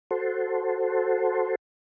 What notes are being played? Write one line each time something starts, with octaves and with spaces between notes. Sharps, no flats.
F#4 A4 C5